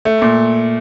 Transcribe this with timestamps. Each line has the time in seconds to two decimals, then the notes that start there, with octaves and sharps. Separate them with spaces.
0.05 A3
0.22 A#2